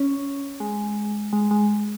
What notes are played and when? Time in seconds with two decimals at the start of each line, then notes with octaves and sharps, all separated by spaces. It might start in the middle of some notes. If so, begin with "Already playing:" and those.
Already playing: C#4
0.60 G#3
1.33 G#3
1.51 G#3